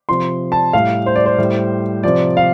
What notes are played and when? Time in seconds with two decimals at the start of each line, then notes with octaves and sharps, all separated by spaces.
0.09 C3 F3 C6
0.52 A5
0.73 A2 G3 F5
1.06 C5
1.16 D5
1.26 C5
1.38 A2 G3
2.03 C3 F3 D5
2.37 F5